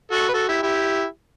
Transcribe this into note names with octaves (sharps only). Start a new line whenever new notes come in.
F#4 A4
B4
F#4 A4
E4 G4
E4 G4